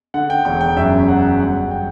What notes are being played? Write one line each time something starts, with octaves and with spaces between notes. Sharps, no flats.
D3 F#5
G5
E1 G5
G5
F#2 E5
F#3 F#5
G1 F#5
G5